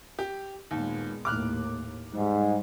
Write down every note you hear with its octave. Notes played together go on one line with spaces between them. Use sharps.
G4
D#2 A#2 G#3 B3
D#2 A2 D6 F6 F#6
G#2 G3